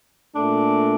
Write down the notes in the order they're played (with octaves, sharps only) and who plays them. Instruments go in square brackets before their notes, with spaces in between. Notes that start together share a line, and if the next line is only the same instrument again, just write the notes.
[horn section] A#2 A3 D4